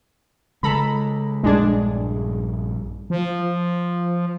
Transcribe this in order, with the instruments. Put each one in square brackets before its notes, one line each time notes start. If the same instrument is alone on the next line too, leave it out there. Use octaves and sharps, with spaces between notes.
[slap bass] C#3 G#3 [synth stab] A4 A#5 B5
[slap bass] A#1 G2 [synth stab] G#3 D4 G#4
[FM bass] F3